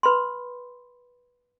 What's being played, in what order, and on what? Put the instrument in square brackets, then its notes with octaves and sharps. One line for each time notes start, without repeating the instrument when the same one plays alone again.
[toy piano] B4 B5 C6